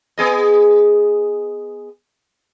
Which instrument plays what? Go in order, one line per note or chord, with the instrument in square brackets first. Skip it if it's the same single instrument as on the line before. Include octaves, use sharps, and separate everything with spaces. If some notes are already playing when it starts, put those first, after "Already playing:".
[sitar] B3 G#4 D#5